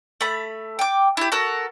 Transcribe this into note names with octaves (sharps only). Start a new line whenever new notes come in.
A3 B5
G5 D6
E4 G4
F#4 A4 A#4